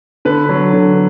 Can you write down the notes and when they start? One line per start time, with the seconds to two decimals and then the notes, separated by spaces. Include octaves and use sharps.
0.25 D3 B4
0.49 F#3
0.73 D3